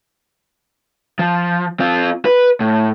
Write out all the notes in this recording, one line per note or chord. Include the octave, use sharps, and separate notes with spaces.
F3
C4 F4
B4
A2